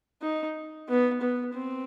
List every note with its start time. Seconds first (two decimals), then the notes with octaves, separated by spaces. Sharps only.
0.22 D#4
0.88 B3
1.21 B3
1.54 C4